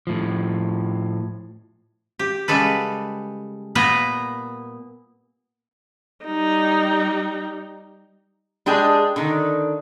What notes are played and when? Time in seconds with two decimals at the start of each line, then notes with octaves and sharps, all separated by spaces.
0.07 A2 F3
2.19 G4
2.48 C#3 G3 G#3 A4 B4
3.75 A#2 A#3 B3 B4 A#5
6.26 G3 D#4
8.66 G#3 D4 G4 G#4
9.16 D3 D#3